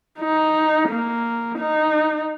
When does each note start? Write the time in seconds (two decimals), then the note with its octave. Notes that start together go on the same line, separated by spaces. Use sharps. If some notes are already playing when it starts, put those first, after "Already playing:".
0.19 D#4
0.89 A#3
1.59 D#4